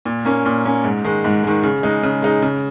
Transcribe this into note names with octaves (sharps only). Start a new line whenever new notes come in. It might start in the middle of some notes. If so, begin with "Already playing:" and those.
A#2
A#3 C#4
A#2
A#3 C#4
G#2
D#3 G#3
G#2
D#3 G#3
C#3
G#3 D#4
C#3
G#3 D#4
C#3